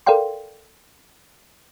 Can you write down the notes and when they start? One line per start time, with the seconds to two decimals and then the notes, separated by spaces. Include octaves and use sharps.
0.06 A4 A#4 D5 F5 G5 C6